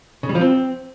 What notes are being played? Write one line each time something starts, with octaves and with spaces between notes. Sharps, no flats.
C#3
G3
F3
C4